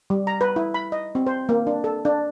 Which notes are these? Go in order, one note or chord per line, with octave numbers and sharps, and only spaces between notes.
G3
A#5
B4
E4
B5
D#5
C4
C5
A#3
D4
A4
D4